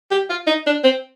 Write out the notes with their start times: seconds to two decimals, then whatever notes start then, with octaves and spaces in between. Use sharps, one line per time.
0.11 G4
0.30 F4
0.47 D#4
0.66 D4
0.84 C4